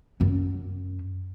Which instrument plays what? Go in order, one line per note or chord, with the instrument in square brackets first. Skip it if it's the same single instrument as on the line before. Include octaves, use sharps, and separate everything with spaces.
[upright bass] F#2 C#4